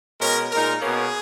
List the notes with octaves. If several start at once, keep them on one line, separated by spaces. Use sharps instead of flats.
B2 G#3 C#4 A#4
A#2 G#3 D#4 A#4
B2 A#3 C#4 G#4